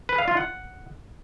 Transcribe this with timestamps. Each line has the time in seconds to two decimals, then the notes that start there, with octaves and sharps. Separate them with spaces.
0.09 B4
0.18 F5
0.28 F4
0.37 F#5